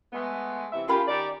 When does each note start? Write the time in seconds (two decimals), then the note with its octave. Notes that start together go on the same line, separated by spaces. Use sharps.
0.12 G#3 A3 B3
0.72 C3 E3 E5
0.88 C#4 F4 G4 A#4 B5
1.07 D#3 G4 D5